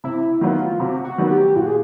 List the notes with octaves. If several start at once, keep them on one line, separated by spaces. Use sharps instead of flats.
C3 E4
D#3 F#3 B3 F4
C3 F#4
F#4
D#3 F#3 B3
G4
A#2 F#4
G#4